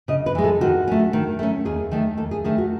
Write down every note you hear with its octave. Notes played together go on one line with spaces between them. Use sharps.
C#3 D#5
B4
E3 G#3
A4
D#3 F#4
A3 C#4
D#3
A3 C#4
D#2 G#4
D#3 A3
D#2 A4
G#4
D#3 A3 G#4
F#4